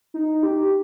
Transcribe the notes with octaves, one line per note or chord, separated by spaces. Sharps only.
D#4
G4